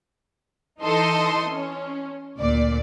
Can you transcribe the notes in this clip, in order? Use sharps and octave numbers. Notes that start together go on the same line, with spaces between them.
E3 D#4 A4 D#5 C6
C#4
D2 A#2 D5